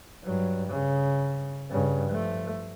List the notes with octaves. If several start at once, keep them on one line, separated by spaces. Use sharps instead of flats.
G2 F#3
C#3
G2 C#3
F3 A3